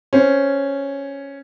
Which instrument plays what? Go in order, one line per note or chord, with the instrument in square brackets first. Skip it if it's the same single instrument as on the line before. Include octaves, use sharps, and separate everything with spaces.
[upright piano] C#4 C5